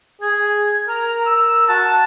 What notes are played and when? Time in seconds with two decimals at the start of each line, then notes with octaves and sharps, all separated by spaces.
0.22 G#4 G#6
0.88 A#4 A#5
1.25 E6
1.69 F#4 A5